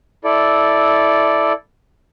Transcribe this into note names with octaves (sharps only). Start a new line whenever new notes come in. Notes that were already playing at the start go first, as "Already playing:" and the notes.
E4 A4 D5